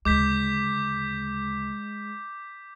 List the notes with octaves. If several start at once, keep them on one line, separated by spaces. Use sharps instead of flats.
D2 C#3 G#3 D6 G6 B6